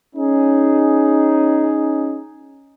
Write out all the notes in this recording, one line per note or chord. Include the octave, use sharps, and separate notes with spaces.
C#4 D#4 G#4